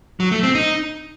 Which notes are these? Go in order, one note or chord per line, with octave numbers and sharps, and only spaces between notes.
F#3
A3
C4
D#4